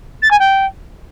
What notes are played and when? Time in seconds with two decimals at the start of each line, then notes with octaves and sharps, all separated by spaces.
0.22 A6
0.31 G#5
0.39 G5